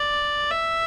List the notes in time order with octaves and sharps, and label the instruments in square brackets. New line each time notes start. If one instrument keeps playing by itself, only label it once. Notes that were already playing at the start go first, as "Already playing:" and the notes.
Already playing: [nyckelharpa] D5
E5